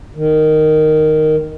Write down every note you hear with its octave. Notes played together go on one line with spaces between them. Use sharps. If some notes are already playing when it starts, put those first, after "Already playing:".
D#3